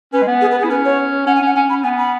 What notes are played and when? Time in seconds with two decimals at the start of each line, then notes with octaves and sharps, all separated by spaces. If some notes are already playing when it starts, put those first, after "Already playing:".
0.13 C#4 B4
0.22 G#3
0.27 B3
0.41 G#4
0.51 B4
0.60 G#4
0.64 E4
0.70 C#4 B4
0.85 C#5
1.27 C#4 F#5
1.36 G#5
1.42 C#4 F#5
1.55 C#4 G#5
1.70 C#4 B5
1.84 B3 G#5
1.98 B5